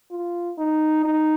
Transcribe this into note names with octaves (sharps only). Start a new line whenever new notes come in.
F4
D#4
D#4